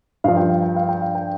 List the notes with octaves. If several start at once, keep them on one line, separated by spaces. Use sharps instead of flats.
G2 F3 F5
G5
F5
G5
F5
G5
F5
G5